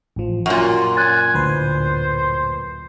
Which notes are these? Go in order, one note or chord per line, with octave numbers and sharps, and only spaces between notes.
A1 F3
F#2 A#2 C#4 F4 F#4
C#4 G#5 F#6 A6
D2 A2 B4 C5